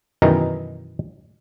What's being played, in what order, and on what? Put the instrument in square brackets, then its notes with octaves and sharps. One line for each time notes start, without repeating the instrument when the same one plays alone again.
[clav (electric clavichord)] F#2 B2 D#3 E3 D#4 A#4